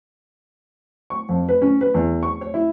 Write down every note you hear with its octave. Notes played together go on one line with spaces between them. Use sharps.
C#6
F2
B4
C#4
B4
E2
C#6
C#5
E4